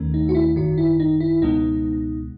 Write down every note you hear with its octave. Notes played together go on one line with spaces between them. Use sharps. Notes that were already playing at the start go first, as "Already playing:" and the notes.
Already playing: D#2 D#3 A3 C#4
D#4
F#4
E4
G#1 F#2 D#3 F#4
E4
D#4
E4
C#2 B2 G#3 B3 D#4